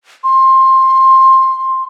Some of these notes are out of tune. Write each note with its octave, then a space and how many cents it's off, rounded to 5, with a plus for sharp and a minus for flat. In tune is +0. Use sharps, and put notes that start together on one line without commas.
C6 +15